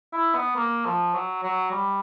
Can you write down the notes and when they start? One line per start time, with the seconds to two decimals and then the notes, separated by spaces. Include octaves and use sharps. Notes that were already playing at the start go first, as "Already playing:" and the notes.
0.13 E4
0.35 B3
0.56 A#3
0.85 F3
1.14 F#3
1.43 F#3
1.72 G3